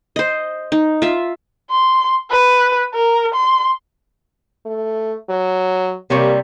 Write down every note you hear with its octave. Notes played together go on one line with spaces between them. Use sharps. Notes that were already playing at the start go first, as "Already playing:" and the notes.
C5 D#5
D#4
F4 E5
C6
B4
A#4
C6
A3
F#3
C3 G3 A#3 C#5